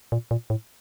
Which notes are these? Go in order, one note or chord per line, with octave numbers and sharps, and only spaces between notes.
A#2
A#2
A2